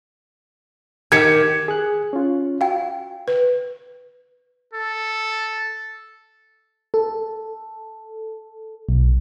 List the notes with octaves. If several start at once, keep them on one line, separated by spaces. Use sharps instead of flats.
D#3 G4 G#6 C#7
G#4 F#6
C#4 F4
F#4 F5 G5
B4
A4
A4
B1